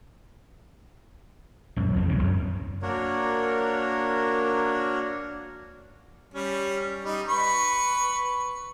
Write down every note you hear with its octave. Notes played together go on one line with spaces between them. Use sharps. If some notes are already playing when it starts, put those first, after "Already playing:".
A#1 F#2
F2 E3 C4
E1 C#2 E3 F#3
F#2
A#3 D4 F#4 A#4 C#5
G3 C#4
G3 D#4
B4 B5 C#6